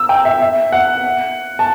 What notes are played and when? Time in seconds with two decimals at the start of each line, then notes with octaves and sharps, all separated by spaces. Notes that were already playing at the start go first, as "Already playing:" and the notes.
Already playing: E6
0.09 G5
0.25 E5
0.42 E5
0.72 F#5
1.59 A5